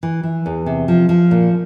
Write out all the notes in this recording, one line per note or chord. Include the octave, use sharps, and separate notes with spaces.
E3
E3
E2
C3
F3
F3
A#2